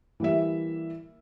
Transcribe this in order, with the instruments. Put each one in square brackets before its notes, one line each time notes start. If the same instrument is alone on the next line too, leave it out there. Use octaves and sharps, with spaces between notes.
[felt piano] E3 G3 A#3 E5